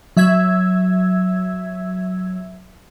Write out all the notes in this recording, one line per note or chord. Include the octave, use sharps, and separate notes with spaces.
F#3 E5 E6 G#6